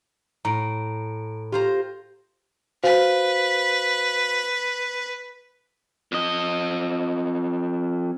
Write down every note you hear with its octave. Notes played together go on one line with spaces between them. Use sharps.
A2 A#5 D7
F4 G4 C5 A#5
F#4 B4 C5 F5
F2 D#5